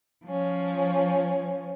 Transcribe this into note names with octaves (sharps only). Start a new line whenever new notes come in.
F3 C#4